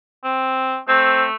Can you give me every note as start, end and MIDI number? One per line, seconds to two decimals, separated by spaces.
0.24 0.78 60
0.88 1.35 57
0.88 1.24 60